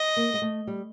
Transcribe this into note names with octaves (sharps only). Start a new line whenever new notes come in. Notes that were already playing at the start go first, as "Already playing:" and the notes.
Already playing: D#5
A#3
G#3
A3
G3